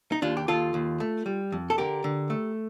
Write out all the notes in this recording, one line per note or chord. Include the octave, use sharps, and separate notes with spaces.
D#4
D#2 D4 F4
G4
D#2 F4 A4
D#2
A3
G3
F2
A4
D3 G4 A#4
D3
A3